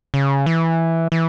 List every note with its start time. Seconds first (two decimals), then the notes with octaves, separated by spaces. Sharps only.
0.14 C#3
0.46 E3
1.12 E3